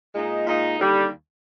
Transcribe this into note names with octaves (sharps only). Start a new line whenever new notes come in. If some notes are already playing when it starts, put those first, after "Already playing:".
A#2 G#3 D#4
A#2 G#3 D#4
D#2 D3 G3